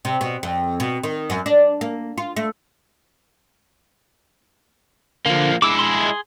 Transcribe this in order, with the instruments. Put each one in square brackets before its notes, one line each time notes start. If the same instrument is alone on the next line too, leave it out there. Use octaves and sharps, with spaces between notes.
[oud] C3
B2
F2
B2
D#3
F#2
D4
A#3
F4
A3
[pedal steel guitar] D3 [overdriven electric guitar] F3 A#3
[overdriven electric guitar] G#3 E4 [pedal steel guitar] D6 E6
[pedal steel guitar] G#4 C6